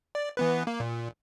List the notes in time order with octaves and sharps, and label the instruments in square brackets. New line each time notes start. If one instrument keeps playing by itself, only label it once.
[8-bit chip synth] D5
E3 B3 B4
A#3
A#2